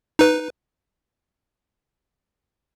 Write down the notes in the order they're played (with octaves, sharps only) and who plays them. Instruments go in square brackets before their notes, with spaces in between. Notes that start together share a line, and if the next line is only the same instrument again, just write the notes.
[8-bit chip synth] D#4 B4